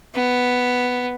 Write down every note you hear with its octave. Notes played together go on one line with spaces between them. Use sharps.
B3